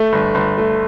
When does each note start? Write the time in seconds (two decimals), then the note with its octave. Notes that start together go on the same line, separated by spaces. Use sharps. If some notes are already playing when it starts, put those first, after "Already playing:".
Already playing: A3
0.13 G1
0.35 G1
0.58 A3